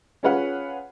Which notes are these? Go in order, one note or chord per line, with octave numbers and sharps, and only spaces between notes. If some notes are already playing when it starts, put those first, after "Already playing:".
C#4 F4 G#4 B4 F5 F#5